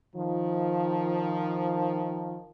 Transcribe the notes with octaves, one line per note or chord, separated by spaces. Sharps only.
D#3 F3